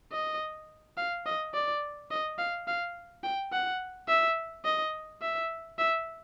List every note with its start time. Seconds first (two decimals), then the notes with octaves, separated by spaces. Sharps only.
0.12 D#5
0.97 F5
1.26 D#5
1.54 D5
2.11 D#5
2.39 F5
2.68 F5
3.23 G5
3.52 F#5
4.08 E5
4.65 D#5
5.22 E5
5.79 E5